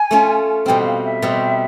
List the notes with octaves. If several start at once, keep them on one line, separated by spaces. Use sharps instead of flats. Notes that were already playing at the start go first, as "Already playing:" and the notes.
Already playing: G#5
A3 C#4 F4
B2 G3 C4 G5
F#5
F5
E5
B2 G3 C4